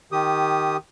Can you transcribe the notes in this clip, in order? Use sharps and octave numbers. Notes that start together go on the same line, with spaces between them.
D#3 G4 D#6